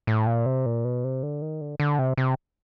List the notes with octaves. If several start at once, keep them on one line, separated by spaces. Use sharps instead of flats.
A2
A#2
C3
A#2
B2
C3
D3
D#3
D3
D3
C3
C3